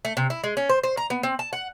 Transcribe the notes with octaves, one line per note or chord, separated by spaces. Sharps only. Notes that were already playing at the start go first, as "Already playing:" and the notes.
A3
C3
E4
G#3
C#4
C5
C5
A#5
B3
C4
A5
F#5